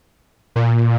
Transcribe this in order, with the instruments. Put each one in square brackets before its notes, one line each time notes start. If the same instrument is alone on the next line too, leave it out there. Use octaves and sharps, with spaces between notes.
[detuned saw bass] A#2